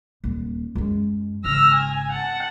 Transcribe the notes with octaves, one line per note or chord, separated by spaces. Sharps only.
D#1 G3
F#2 G#3
G#1 C#3 E6 F6 A#6
G#5
F#5 A5